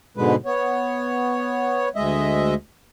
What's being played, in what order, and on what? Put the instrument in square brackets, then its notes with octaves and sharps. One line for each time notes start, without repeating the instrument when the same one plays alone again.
[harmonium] G#2 B2 D3 G#3 B4
B3 C#5
D2 G#3 D#5 E5